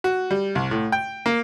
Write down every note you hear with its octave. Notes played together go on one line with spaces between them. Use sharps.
F#4
G3
C2
A2
G5
A#3